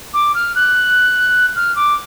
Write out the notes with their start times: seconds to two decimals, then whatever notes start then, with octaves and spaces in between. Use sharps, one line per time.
0.14 D6
0.34 F6
0.55 F#6
1.56 F6
1.75 D6